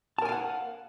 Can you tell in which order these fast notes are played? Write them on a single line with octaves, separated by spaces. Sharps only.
A5 A#4 G#5 F5 F#5